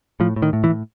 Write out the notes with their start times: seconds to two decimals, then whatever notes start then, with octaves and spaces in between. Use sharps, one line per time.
0.20 A2 F3
0.36 A2
0.42 D#3
0.53 A2
0.64 E3
0.69 A2